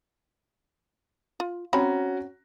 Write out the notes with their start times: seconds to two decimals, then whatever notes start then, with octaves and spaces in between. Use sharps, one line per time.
1.40 F4
1.73 C4 C#4 F#4 A#5 B5